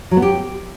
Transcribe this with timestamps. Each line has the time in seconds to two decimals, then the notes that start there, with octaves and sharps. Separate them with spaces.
0.11 F#3
0.17 B3
0.22 G4